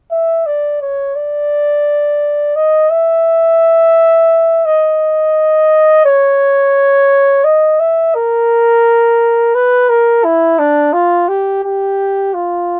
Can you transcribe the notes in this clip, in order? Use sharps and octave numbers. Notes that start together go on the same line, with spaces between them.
E5
D5
C#5
D5
D#5
E5
D#5
C#5
D#5
E5
A#4
B4
A#4
E4
D4
F4
G4
G4
F4